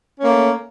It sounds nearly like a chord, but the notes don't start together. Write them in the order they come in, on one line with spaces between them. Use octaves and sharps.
C#4 A#3 A3